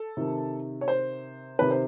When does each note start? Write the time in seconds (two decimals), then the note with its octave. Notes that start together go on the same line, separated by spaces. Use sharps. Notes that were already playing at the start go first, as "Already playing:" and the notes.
Already playing: A4
0.17 C3 D#3
0.81 C#5
0.88 C5
1.59 C3 D#3 B4
1.71 C5